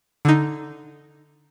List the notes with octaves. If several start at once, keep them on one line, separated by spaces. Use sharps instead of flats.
D3 D#4